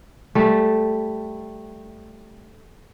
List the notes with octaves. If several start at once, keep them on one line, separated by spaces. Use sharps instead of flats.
G3 A3